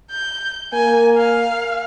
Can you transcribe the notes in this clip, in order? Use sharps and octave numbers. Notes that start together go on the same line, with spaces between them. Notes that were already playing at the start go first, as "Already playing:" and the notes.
G6
A#3 G#5
F5